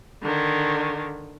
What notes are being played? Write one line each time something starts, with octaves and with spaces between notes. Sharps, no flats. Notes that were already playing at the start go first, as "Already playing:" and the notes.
D3 D#3